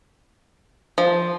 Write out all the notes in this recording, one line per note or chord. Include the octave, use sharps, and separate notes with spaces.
F3